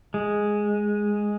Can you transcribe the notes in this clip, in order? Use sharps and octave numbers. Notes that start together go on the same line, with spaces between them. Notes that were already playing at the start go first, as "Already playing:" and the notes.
G#3